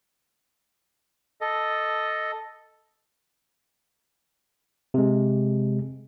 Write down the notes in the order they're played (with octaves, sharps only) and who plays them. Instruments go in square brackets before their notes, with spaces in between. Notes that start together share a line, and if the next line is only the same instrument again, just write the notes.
[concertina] A4 D#5
[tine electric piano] C3 G#3